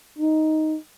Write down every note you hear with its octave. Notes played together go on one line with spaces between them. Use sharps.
D#4